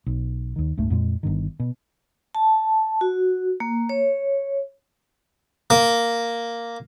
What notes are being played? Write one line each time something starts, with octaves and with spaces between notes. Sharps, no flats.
B1
D#2 D#3
F#1 C#2 G#2 A3
F2 A#2 G#3
G1 G2 D#3
B2
A5
F#4
A#3
C#5
A#3